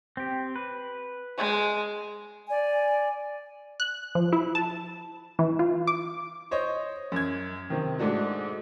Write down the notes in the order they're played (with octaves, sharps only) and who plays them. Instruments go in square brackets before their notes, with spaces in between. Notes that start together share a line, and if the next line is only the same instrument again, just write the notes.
[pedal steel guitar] C4 G4
B4
[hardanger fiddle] G#3
[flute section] D5 G#5
[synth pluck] F#6
F3
E4
A5
E3
F4
D6
[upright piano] C5 C#5 D#5
F#2 G#6
C3 D#3
G#2 A3 D4 F#4